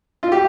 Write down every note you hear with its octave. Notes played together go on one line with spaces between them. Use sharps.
F4
G4